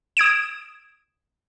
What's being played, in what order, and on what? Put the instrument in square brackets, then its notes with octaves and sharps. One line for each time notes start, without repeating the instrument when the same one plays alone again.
[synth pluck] D#6 G#6 D7 E7